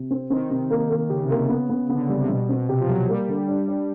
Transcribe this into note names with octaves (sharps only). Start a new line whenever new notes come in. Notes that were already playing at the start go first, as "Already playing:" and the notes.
Already playing: C3
C4
D#3 C4
C3
A#3
A#3
C#3 G4
C3
A#3
C#3
B3
B3
D3 B3
C#3 G3
C3
B2 G3
B2 C4
C3 G4
F3
F#3 G4
G3 A#3
D3
D4
D4